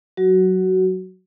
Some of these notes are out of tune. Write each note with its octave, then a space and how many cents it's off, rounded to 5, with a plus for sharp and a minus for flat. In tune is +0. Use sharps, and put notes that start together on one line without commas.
F#3 +0 F#4 +15